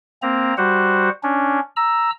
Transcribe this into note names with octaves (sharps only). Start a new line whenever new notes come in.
A#3 C4 A#5
G3 F#4 C5 F#5
C#4 D4
A#5 E6